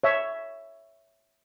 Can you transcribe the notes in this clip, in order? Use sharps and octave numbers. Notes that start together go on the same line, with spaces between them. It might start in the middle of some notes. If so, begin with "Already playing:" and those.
C#5 E5